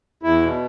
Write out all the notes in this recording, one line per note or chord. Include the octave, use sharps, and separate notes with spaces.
E2 E4
B2